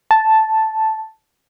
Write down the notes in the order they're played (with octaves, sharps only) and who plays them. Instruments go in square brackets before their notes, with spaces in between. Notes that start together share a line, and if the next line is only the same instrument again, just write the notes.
[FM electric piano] A5